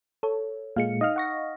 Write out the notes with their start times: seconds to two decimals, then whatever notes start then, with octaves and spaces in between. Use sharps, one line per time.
0.23 A4 C#5
0.76 A#2 G#3 F5 C#7
1.01 D#4 D#5 F5 F6
1.16 F#5 C#6 A#6